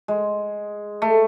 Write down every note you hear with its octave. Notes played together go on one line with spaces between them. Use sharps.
G#3
A3